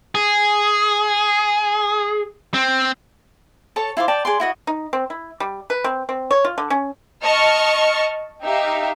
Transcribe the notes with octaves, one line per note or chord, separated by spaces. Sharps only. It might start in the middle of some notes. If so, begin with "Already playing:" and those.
G#4
C4
A4 C#5 A5
E4 F4 C5 D6
D5 G5 A5
G#4 D5 C6
E4 F#4 D#5
D#4
C4
E4
G3
B4
C4
C4
C#5
F4
D3
C#4
D#5 A5 C#6 F6
D#4 G4 E5 F5